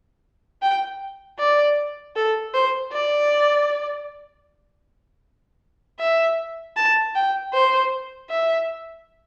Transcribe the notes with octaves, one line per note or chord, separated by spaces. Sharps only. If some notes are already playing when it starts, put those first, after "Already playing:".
G5
D5
A4
C5
D5
E5
A5
G5
C5
E5